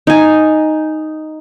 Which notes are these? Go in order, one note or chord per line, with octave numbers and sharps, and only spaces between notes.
D#4 G#5